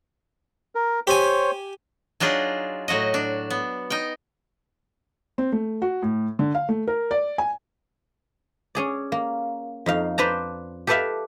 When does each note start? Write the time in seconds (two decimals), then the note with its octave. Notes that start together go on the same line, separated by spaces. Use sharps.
0.75 A#4
1.07 G4 C5 C#5 G#5
2.20 F#3 D4 D#4 F4 G#4
2.88 A2 F#3 F#4 D#5
3.14 D4
3.50 B3
3.90 D#4 G5
5.38 C4
5.52 A3
5.82 F#4
6.02 A2
6.39 D3
6.55 F5
6.69 A3
6.88 A#4
7.11 D5
7.38 G#5
8.75 C#4 G#4 D5
9.12 A#3
9.86 F2 D#4 F5
10.18 B4 C5 D5 A5 A#5
10.87 G4 A4 B4 D5 E5 F5